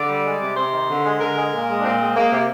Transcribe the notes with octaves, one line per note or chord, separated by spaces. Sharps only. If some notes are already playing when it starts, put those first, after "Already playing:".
Already playing: D3 D5
G3
G#3
C3
C3 C5
D#3
D3
G#3
D3 A#4
G#3
A#2
G#3
D4
A#2 C4
G#3
G#3 A#3
C3